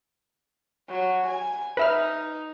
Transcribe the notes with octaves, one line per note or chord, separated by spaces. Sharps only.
F#3
G#5
D#4 B4 E5 F6